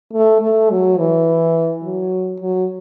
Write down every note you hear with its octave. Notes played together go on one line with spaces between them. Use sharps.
A3
A3
F#3
E3
F#3
F#3